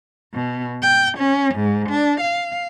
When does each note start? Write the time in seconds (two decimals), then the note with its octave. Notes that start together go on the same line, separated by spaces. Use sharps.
0.34 B2
0.82 G5
1.18 C#4
1.55 G#2
1.90 D4
2.21 F5